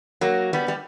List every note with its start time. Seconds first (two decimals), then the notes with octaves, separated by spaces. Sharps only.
0.21 F#3 A#3
0.53 G3 B3
0.68 G3